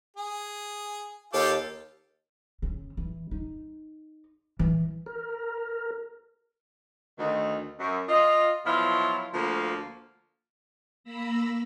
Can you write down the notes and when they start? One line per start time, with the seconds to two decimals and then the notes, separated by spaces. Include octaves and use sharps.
0.17 G#4
1.33 D#2 F4 G4 A4
2.62 C#3
2.97 E3
3.31 D#4
4.59 E3
5.06 A#4
7.19 D2 D#3
7.79 F#2
8.09 F4 D#5
8.65 B2 F3 F#3 E4 F4
9.33 D2 F3 A#3
11.04 A#3 B5 E6 A#6